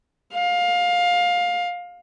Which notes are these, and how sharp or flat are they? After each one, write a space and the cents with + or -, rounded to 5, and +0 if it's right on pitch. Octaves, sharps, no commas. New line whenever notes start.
F5 +20